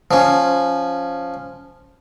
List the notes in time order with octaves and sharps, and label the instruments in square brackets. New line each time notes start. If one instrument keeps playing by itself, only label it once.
[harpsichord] F3 C#4